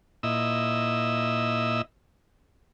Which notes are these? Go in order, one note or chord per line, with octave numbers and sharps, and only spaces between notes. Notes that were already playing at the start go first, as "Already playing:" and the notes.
A#2 E4 D#5 E6